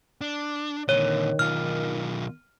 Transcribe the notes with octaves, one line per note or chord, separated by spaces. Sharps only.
D4
A#2 D3 D#3 C#5
B1 F4 F6